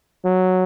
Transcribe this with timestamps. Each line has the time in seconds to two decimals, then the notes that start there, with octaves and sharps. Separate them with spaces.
0.25 F#3